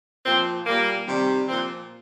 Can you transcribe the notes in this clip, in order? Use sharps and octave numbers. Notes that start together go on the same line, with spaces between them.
A#2 F3 C4
A#2 G3 A#3
C3 D#3 G3
A#2 F3 C4